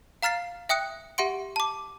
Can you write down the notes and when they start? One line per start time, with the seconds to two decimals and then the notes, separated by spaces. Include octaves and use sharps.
0.22 F5 A#5 F6 A6 C7
0.69 E5 G5 D#6 F#6 C#7
1.18 G4 E5 F#5 C6 D7
1.56 A5 D6